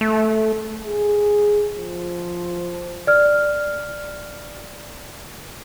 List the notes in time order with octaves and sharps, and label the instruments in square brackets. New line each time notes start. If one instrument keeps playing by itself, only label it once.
[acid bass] A3
[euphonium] G#4
F3
[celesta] D5 F6